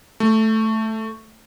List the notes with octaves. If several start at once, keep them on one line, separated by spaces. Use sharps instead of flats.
A3